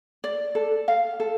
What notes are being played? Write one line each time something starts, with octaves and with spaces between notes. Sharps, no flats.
D5
A4
F5
A4